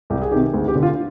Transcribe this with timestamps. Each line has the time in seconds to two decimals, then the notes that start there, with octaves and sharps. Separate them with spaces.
0.10 C2 G4
0.22 G#4
0.32 C3 D#3 G4
0.53 D2 G#4
0.68 G4
0.75 D3
0.83 F4